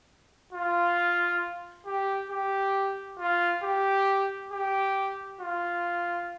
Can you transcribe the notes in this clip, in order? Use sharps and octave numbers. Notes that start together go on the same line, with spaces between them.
F4
G4
G4
F4
G4
G4
F4